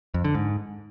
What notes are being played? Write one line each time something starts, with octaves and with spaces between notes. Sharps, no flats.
F2
D3
G#2